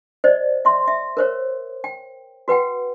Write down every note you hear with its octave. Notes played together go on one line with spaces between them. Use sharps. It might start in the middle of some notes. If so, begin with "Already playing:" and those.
C5 D5 D#5
E5 C6
E5
A#4 C5 C#5
G5
F#4 B4 F#5 G5